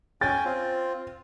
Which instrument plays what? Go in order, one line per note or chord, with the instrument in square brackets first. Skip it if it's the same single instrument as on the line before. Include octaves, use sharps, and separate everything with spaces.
[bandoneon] C#4 G5 G#5 [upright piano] A6
[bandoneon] C4 F4